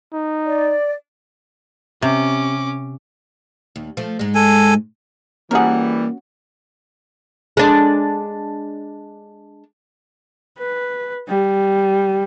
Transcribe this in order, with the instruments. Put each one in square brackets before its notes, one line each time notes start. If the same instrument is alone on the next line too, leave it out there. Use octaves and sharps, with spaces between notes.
[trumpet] D#4
[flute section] D5
[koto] C3 [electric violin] C#4 D6
[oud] D#2
F3 A3
G#2 G#3
[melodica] A4 G#5
[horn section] E3 G3 [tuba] A#3 [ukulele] C#4 F#4 F#5 [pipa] G#4 A#4
[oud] G#3 D4
[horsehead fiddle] B4
G3